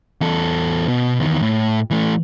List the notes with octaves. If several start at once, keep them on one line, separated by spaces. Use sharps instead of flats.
E2 A4
B2
E2 D#3
A2
E3 A3